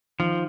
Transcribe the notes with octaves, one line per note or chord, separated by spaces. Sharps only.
D#3 F3